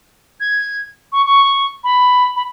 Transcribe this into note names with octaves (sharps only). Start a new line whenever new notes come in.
G#6
C#6
C#6
B5
B5